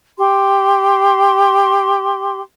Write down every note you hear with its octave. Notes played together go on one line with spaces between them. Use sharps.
G4 C6